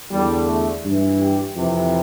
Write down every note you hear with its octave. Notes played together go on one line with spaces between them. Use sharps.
E2 D3 G3
A3
G2 E3
G4
F2 C3 E3